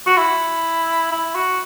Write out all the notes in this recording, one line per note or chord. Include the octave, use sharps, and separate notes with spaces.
F#4
E4
E4
F#4